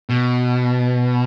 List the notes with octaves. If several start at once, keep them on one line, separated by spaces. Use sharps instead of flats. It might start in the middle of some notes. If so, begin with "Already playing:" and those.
B2